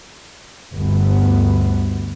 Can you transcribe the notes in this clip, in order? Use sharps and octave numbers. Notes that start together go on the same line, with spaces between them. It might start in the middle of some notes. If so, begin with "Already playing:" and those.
G1 D2 B3